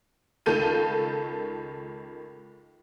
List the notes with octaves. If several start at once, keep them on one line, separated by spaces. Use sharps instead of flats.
C#2 D#3 A4 G6 D#7